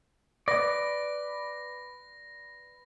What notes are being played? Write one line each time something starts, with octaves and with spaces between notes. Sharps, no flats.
B4 D5 A#6